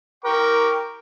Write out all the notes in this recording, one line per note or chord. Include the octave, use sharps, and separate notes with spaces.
A#4 G5 C#6 D6